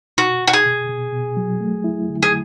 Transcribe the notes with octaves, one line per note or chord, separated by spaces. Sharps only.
B2 F#4
B2
F#4
G#4
B2
B2
B2
F#3
A3
E4
D3
G#4